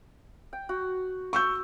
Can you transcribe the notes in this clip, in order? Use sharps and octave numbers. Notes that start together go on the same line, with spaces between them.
G5
F#4
C#6 E6 G6